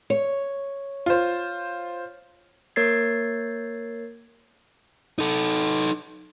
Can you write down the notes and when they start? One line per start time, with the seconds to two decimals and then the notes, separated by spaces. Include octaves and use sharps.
0.10 C#5
1.06 F4 C5
2.76 A#3 A#4 C#5 G#6 A6 C7
5.19 D#4 A4